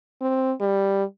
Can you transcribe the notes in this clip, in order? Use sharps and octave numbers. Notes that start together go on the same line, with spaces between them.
C4
G3